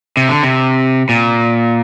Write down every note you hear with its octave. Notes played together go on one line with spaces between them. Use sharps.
C3
D3
C3
A#2